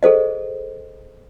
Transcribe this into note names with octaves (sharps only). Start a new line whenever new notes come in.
G#4 A4 C5 D#5